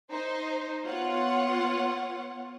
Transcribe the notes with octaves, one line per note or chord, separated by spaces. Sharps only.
D#4 C5
B3 F4 C#5 F#5